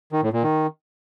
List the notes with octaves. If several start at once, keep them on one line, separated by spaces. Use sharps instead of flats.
D#3
A2
A#2
D#3